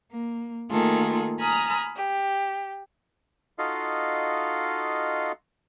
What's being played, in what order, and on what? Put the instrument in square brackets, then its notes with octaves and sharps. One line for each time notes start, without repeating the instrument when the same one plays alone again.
[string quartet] A#3
D#3 A3 A#3 F4 G#4 A4
G#5 A#5 B5 D#6 F6
G4
[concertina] D#4 F4 F#4 A4 D#5 F5